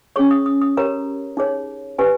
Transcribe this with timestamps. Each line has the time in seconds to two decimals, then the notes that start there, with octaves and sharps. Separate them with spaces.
0.16 C#4 G#4 C#5 C#6
0.31 D#6
0.46 D#6
0.61 D#6
0.77 G4 A#4 C#5 A#5
1.37 D#4 G#4 C#5
1.99 G4 B4 G#5